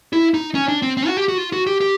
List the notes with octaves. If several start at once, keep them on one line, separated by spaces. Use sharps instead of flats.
E4
D#4
C#4
D4
C4
C4
F#4
G4
F#4
F4
F#4
G4
G4